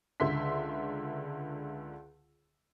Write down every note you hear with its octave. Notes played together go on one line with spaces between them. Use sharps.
C#2 D3 E5 C6 B6